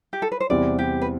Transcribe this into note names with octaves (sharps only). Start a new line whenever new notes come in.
G4
A4
B4
C5
E2 C3 G3 C4 E4 D5
G4
B4